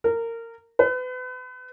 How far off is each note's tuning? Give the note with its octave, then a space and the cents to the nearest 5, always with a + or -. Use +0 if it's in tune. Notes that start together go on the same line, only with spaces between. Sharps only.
A#4 -20
B4 +35